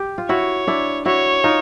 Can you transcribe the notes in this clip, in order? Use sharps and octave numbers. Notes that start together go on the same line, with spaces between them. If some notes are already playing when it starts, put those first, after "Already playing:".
Already playing: G4
F4
E4 F#4 C#5
D4 E4
E4 F#4 C#5
D#4 F4